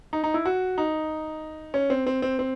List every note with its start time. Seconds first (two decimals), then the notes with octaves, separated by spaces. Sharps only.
0.13 D#4
0.24 D#4
0.34 E4
0.45 F#4
0.78 D#4
1.74 C#4
1.90 C4
2.07 C4
2.22 C4
2.39 C4